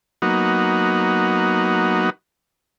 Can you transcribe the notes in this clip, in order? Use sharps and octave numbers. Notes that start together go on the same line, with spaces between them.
F#3 A#3 B3 D#4 F#4